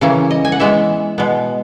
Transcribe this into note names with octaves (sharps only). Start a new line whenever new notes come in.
C#3 E3 A#3 C#4
D#5
G#5
F#5
E3 G#3 B3 E5
B2 G#3 B3